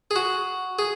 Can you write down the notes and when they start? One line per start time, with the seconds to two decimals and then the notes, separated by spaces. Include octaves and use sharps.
0.11 G#4
0.16 F#4
0.79 G#4